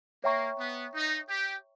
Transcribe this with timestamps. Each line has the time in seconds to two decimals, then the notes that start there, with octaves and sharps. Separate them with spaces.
0.24 A#3 C#5 E5 G5 A#5 C#6
0.59 B3
0.95 D#4
1.30 G4